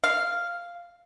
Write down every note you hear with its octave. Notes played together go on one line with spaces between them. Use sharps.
F5